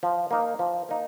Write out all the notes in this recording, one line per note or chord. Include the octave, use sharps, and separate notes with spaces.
F3
A#3 D#4
F3
A#3 D#4